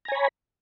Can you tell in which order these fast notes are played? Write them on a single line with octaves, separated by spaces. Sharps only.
A#5 G#5 C#5 B5